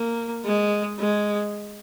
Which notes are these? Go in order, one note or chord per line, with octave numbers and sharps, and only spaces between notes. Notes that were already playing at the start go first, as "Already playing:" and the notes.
Already playing: A#3
G#3
G#3